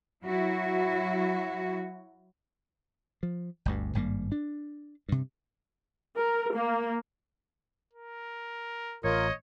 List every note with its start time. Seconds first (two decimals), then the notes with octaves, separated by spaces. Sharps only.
0.23 F#3 E4 F#4
3.23 F3
3.66 G1 D2 G2
3.95 G#1 G2 G3 A#3
4.32 D4
5.09 G2 C3
6.17 A#4
6.54 A#3
7.94 A#4
9.04 A1 F4 A#4 C#5 D#5